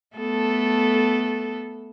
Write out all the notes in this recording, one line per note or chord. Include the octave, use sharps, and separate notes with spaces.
A3 B3 A4